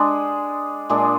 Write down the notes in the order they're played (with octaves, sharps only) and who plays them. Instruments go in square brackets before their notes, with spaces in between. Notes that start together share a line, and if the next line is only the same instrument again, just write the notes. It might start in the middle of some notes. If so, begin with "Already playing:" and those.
Already playing: [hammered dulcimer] G#3 D4 G#4
A#2 G#3 D4 G#4